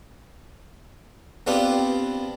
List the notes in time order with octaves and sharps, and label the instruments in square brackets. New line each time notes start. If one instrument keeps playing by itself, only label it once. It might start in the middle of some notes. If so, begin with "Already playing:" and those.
[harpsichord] B3 C4 D4 F4 G4 B4